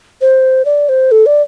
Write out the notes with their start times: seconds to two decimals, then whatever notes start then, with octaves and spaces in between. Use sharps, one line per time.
0.21 C5
0.65 D5
0.89 C5
1.11 A4
1.26 D5